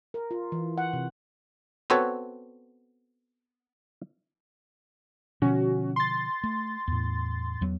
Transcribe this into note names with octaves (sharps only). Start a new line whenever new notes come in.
A#4
F4
E3
F#5
C3
B3 C4 F#4 A4 B4 C#5
B2 D3 F3 C#4 F#4
C6 A6
A3
E2 A2
E2 F#3 B3